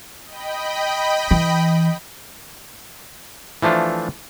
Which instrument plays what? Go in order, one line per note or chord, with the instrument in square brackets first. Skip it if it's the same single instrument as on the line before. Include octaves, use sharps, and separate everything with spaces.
[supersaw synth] D#5 G5 B5
[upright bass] E3
[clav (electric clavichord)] E3 F3 A3 D4 F4